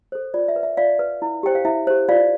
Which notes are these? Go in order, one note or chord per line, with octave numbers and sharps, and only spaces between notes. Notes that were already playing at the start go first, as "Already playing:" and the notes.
A4 C5
F4 D5
E5
B4
E5
F4 D5 F5
B4
E4
G4 C5 G5
F5
E4 E5
G4 C5
F4 D5 F5